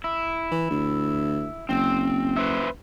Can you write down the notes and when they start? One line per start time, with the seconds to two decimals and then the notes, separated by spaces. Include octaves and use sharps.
0.04 E4
0.51 E3
0.71 D2
1.69 F#1 C4
2.36 B4 C5 E5